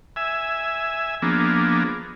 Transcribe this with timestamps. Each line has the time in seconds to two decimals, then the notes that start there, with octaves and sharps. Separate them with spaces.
0.16 E5 G#5
1.22 F3 A#3 B3 D4 G#4